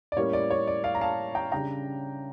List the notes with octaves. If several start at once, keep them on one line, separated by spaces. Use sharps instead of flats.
D5
A2 G3 A#3 C#4 C#5
D5
C#5
D5
D5 F5
A#5
F5 A5
G5 A#5
C#3 G3 D4 G5 A#5